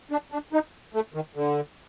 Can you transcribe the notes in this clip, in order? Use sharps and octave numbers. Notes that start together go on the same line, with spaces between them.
D4
D4
D#4
A3
D#3
D3